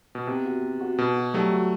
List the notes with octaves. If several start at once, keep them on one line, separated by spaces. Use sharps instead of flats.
B2
C3 B3
F#4
B3
F#4
B2 B3
F#4
F#3 G3 A3
F#4